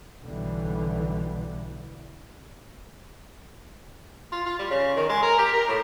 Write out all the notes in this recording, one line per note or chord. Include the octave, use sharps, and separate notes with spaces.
B1 B2 D3 E3 G3
F4
F4
G3
C#3
D#3
G#3
A#4
G4
A#4
A2